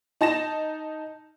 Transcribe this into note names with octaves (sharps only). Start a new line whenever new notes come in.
D#4 A5 A#6 E7